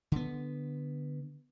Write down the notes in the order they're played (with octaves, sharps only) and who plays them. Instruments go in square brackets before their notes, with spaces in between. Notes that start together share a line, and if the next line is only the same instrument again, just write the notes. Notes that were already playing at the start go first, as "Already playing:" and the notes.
[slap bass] D3 B3